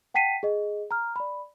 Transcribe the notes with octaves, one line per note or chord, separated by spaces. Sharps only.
F#5 G5 A5 B6 C7 D#7
G#4 D#5
A#5 F6
D5 B5